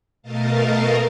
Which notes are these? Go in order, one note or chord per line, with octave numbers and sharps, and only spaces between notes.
B2 A3 A#4 D#5 F5 A5